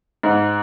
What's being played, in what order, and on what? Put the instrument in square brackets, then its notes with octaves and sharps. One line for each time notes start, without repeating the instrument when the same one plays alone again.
[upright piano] G#2